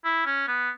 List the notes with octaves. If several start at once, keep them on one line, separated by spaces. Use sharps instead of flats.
E4
C#4
B3